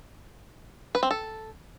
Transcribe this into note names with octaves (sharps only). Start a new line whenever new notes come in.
B4
C4
A4